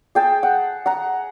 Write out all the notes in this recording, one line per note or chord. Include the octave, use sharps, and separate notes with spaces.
G#4 G5 A5
F#5
F#5 A#5